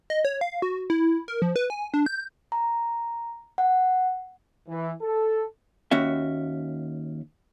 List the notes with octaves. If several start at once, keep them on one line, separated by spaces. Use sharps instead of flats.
D#5
C#5
F5
F#4
E4
A#4
F3
B4
G#5
D4
G6
A#5
F#5
E3
A4
D#2 C#4 F#4 E5